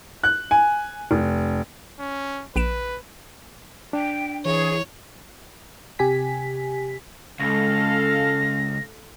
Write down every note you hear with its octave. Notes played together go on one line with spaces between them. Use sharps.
F#6
G#5
F1
C#4
A#1 B4 D7 E7
D4 G5
E3 G#4 C#5
C3 G4 G#5 B6
C#2 G#3 C#4 A4 F5 A#6